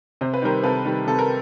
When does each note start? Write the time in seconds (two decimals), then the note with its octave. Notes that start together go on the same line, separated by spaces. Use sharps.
0.21 C3 C5
0.34 B4
0.42 D#3 G3 A#4 C5
0.64 C3 A4 B4
0.85 D#3 G3
1.07 C3 A4
1.19 A#4